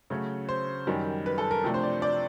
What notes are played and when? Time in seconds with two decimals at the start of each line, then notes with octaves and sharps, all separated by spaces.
0.10 C#3 F#3 A3 C#4
0.49 C5
0.87 F#2 D#3 G3
1.26 B4
1.38 A4
1.51 A#4
1.64 C3 F3 A3 D4
1.74 C5
1.83 D5
2.02 D5